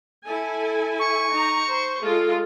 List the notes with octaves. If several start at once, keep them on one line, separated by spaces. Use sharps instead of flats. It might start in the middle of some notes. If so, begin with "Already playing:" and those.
E4 A4 G#5
C#6
D#4 A#5
C5
G#3 F4 A4